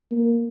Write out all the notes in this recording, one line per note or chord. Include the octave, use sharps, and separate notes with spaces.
A#3